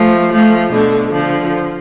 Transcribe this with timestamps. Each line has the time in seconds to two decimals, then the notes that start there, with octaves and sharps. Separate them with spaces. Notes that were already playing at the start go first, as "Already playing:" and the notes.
Already playing: F3 A3
0.32 F3 A3
0.72 B2 D3
1.12 D3 F3